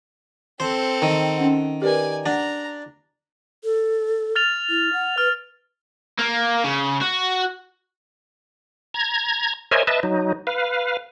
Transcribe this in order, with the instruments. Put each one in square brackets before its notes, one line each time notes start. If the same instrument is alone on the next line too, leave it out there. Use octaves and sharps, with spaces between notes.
[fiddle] C4 A4 [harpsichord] C5
[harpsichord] D#3
[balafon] C#4 F#5
[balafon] G4 A#4 B4 [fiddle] D5 G#5
[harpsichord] D4 [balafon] F#5 [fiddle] A#5
[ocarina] A4
[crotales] F6 A6 F7
[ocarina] E4
F#5
[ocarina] B4 [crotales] F6
[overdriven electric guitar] A#3
C#3
F#4
[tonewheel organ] A#5 G#6
A#4 C5 C#5 D#5 E5 G#5
B4 D#5 E5 A5
F#3 D#4
B4 F5